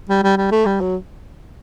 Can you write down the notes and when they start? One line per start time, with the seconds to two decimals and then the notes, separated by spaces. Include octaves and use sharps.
0.09 G3
0.23 G3
0.37 G3
0.51 A3
0.66 G3
0.81 F#3